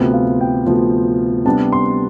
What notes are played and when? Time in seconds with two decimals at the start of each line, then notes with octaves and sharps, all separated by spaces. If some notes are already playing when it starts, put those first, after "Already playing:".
Already playing: D2 C3 F3 B3
0.14 F5
0.41 G5
0.67 D2 C3 F3 B3
1.45 C3 G3 B3 D4 A5
1.72 C6